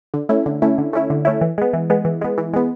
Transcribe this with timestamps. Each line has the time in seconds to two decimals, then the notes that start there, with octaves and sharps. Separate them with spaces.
0.14 D3
0.29 A3 C#4 E4
0.46 D3
0.62 A3 C#4 E4
0.78 D3
0.93 A3 C#4 E4
1.10 D3
1.25 A3 C#4 E4
1.41 E3
1.58 G#3 B3
1.73 E3
1.90 G#3 B3
2.05 E3
2.21 G#3 B3
2.38 E3
2.53 G#3 B3